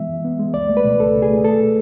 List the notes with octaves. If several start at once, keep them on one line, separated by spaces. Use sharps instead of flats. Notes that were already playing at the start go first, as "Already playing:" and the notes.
Already playing: E3 G#3 B3 E5
F#2
B3
G#3
C#2 D5
A3
B4
B2
C#2 A4
C#2
G#4
A3
A3 A4
B2